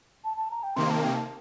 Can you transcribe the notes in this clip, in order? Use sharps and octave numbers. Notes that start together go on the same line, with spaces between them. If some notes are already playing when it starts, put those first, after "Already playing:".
A5
A5
A#5
G5
C3 D#3 A#3 C6
A5
G5
A5